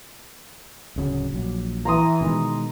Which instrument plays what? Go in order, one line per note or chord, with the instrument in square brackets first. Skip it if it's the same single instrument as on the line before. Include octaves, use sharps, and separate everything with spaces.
[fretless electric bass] D1 C#3 F#3
A#1 F#3
[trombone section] E3 [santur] A#5 C6 D#6
[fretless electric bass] B2 D#3 G#3